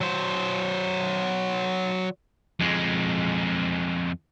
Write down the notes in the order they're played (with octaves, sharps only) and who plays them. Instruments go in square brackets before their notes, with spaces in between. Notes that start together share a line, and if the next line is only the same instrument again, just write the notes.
[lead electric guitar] F#3 C5
[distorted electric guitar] F2 G#3